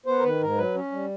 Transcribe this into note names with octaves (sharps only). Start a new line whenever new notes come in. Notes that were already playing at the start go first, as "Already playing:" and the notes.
B3 C5
A#4
D#3 B4
G#2 A#4
F#3 B4
C#4
G3